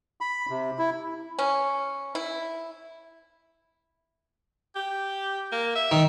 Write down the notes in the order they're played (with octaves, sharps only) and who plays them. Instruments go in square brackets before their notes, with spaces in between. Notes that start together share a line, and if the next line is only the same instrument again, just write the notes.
[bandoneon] B5
C3
E4
[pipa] C#4
E4
[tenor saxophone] G4
A#3
E5
[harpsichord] D#3